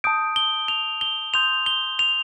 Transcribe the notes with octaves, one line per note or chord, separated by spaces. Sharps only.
A5 D#6 G6 D7
G7
F7
G7
C6 D#6 G6 F7
G7
F7